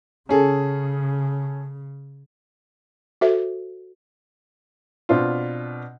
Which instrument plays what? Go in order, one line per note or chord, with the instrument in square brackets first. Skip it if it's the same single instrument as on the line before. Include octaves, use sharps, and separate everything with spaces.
[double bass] C#3 [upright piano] C#4 G#4 A4
[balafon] F#4 A4 C5 E5
[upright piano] B2 C4 D4 F4